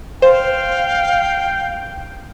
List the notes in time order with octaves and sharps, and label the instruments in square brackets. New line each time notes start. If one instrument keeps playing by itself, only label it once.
[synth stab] C5 [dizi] F5 [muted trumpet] G5